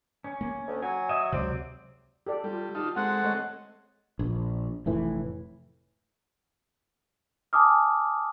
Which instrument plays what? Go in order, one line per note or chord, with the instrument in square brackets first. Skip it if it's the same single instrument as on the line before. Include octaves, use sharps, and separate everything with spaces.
[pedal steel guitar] C#4
[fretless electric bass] A#3
[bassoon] D2
[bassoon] F#3 [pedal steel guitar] G#5
[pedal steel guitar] D#5 E5
[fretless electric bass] C#2 C3 [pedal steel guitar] F#3 D5 [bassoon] C4
[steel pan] G4 A4 D5
[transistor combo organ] G3 [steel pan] F4 A4
[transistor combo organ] D#4 F4 [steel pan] G4 A5
[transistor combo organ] G#3 C4 A4 [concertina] F#5
[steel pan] A3 C#5 D#5
[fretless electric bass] A#1
F1 A2 E3
[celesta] G#5 A5 D6 D#6 F6